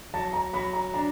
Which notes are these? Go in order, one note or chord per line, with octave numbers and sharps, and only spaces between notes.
F#3 A5
A#5
F#3 B5
A#5
D4 A#5